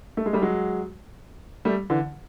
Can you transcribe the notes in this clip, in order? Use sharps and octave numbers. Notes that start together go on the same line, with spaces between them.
A3
G#3
G3 A3
F#3 G#3
G3 A3
D3 E3